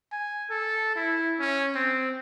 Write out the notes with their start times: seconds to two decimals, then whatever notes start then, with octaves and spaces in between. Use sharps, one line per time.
0.12 G#5
0.50 A4
0.96 E4
1.40 C#4
1.75 C4